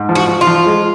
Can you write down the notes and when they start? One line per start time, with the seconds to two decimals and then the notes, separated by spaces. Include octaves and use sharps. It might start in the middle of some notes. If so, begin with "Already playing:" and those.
Already playing: G#2
0.09 F3
0.15 F#4
0.28 F3
0.41 F4
0.47 F3
0.66 G#3